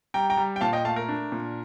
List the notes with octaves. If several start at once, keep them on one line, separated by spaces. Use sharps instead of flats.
G3 G5 A#5
G5 A#5
G3
G5
A#2 F5 A5
D#5 G5
A3 F5 A5
A#4
D4
A#2